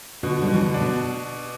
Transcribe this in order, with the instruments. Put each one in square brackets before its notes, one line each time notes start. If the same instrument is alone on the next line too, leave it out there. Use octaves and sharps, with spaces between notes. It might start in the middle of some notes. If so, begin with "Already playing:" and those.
[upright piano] B2 [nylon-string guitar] D3
[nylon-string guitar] G3
[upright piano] B2
[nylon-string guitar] E3
D3
[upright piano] D4
[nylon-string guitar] B2